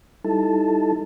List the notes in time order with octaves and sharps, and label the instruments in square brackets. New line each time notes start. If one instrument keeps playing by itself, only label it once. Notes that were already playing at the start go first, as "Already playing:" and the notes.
[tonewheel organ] G3 D#4 E4 A4 A5